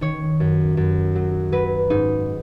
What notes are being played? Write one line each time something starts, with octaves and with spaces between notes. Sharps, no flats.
D#3 C#5
F#2
F#2
F#3
F#3 B4
G#2 D#4